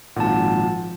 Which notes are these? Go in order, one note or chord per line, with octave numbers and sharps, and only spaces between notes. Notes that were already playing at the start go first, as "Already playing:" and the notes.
G#1 A#2 F3 F#5 A5